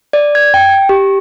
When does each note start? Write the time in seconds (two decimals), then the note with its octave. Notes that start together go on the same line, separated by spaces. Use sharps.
0.13 D5
0.35 G#6
0.54 G5
0.89 G4